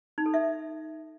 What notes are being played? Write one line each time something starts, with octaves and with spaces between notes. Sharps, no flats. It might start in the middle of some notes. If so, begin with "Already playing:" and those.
D#4
A4
E5